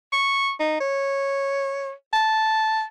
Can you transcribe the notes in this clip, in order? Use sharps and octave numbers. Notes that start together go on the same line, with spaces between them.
C#6
D#4
C#5
A5